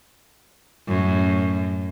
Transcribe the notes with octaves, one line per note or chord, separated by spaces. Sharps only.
F#2 A2